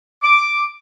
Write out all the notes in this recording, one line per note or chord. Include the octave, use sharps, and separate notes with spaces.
D6